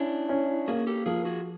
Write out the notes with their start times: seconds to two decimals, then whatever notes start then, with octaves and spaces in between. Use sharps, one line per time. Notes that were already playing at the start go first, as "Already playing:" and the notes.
Already playing: C#4 D4 E4
0.29 C#4
0.68 A#3 F#4 G#4
0.87 G4 A4
1.06 F3 G#4 A#4
1.25 F#4 G#4